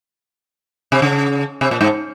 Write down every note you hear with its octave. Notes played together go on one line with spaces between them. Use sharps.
C3
C#3
C3
A#2
G#2